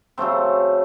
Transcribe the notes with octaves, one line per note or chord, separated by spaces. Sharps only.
C#3 F#3 A3 C4 C5